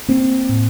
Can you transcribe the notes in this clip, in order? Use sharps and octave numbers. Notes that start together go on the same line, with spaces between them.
A#3 C4
A2